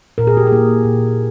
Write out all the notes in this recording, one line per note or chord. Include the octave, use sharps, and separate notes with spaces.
A#2 A#4
G#4
G4
G#4
A#3 E4
A#2